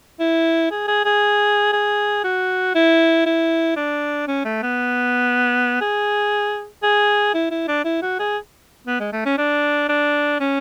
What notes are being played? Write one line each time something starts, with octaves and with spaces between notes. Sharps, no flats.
E4
G#4
G#4
G#4
G#4
F#4
E4
E4
D4
C#4
A3
B3
G#4
G#4
E4
E4
D4
E4
F#4
G#4
B3
G#3
A3
C#4
D4
D4
C#4